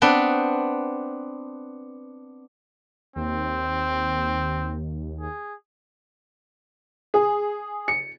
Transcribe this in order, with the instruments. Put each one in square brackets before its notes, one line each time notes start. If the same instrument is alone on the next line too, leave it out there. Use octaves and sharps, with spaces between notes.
[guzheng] B3 C4 D4 B4
[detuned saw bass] D#2 [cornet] C4
[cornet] G#4
[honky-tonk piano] G#4
C#7